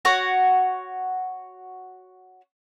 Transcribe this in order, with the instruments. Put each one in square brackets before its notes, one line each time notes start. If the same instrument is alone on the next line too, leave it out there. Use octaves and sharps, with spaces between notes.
[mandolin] F#4 C#5 F#5